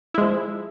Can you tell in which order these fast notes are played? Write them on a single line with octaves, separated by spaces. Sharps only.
E4 G#3 F3